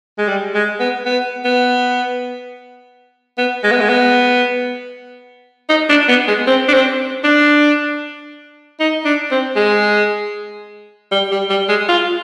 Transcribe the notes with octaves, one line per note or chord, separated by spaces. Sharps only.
G#3
G3
G#3
B3
B3
B3
B3
G#3
B3
G#3
B3
D#4
D4
B3
G#3
C4
D4
C4
D4
D#4
D4
C4
G#3
G3
G3
G3
G#3
F4